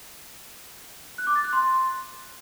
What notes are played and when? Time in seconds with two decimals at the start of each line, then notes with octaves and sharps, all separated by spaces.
1.18 F#6
1.27 D6
1.35 A6
1.44 F#6
1.53 C6